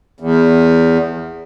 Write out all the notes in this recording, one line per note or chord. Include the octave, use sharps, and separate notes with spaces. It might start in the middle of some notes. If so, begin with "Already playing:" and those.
E2